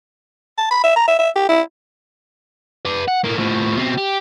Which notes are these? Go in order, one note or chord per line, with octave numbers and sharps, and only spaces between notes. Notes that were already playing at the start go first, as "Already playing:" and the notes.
A5
B5
E5
A#5
E5
E5
G4
E4
B4 D5
F#5
A2 A#3
A2 F3
B2 C4
G4